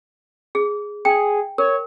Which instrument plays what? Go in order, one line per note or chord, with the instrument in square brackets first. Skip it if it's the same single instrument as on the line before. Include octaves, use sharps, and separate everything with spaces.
[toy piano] G#4
[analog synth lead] G#4 [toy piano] G5
[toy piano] A#4 [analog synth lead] C#5